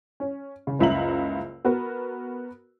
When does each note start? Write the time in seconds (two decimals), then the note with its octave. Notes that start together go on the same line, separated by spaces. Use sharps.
0.20 C#4
0.67 C#3
0.79 F#1 C#2 E5 A#5 F#7
1.65 B3 F#4 A#4